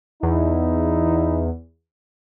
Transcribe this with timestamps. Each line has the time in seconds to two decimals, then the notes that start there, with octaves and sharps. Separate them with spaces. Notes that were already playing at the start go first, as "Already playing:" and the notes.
0.23 E2 D#4 E4